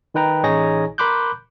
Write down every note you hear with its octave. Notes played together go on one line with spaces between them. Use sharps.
D#3 D#4 B4 G5 A#5
A1 D#4 G#4 C#5 G#5 A#6
A#4 B5 C6 D6 F#6 G6